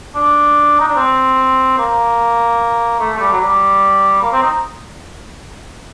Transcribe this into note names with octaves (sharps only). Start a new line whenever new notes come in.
D4
D#4
D4
C4
A#3
A3
A3
G3
F#3
G3
A#3
C4
D#4